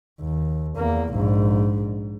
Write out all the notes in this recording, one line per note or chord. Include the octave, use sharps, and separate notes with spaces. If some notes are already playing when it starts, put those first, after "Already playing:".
D#2
E2 A#3
A#1 G#2